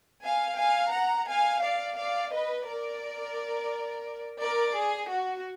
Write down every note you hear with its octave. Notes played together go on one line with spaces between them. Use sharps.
F5 G#5
F5 G#5
F#5 A#5
F5 G#5
D5 F5
D5 F5
B4 D#5
A#4 D5
A#4 D5
G#4
F#4